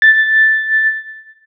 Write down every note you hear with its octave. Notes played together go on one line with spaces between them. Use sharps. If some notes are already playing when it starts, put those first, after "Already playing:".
A6